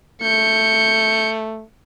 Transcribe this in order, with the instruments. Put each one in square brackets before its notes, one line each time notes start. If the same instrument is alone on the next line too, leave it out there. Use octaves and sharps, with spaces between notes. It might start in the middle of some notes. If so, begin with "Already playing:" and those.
[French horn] A3 [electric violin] G6 C#7